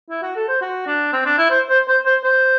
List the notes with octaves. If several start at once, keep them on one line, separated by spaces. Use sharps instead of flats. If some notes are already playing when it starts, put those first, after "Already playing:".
E4
F#4
A4
C5
F#4
D4
C4
D4
E4
C5
C5
C5
C5
C5